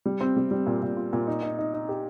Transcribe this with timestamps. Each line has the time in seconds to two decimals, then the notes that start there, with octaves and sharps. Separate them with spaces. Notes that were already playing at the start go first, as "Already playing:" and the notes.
0.06 G3
0.21 C4
0.37 G3
0.51 G3
0.66 A#2
0.82 A#2
0.97 F4
1.13 A#2
1.27 D#4
1.43 D#4
1.58 D#4
1.74 D#4
1.89 G4